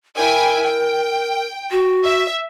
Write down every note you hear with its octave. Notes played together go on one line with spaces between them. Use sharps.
E4 A#4 G5 G#5
G5
F#4
E5